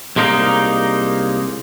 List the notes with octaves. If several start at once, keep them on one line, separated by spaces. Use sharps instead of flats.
C2 G#3 A#3 D#4